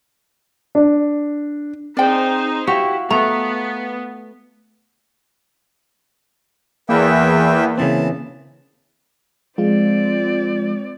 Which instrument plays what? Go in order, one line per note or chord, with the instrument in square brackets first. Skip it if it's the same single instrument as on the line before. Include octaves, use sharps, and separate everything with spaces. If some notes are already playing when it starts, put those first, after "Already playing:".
[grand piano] D4
[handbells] C4 G#4 [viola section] D#4 C5 [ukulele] D5 G5
[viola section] E4 [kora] F#4 [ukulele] G4 [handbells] F5 C#7
[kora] A3 [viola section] B3 [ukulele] A#5
[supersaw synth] E2 [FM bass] A#3 [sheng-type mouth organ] B4 E5 G5
[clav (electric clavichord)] C#3 E3 C4 [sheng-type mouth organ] B3 A5
[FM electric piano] F3 G#3 F4 [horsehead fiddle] C4 D5